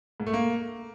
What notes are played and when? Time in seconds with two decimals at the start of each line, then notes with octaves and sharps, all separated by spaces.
0.20 G#2
0.27 A3
0.33 A#3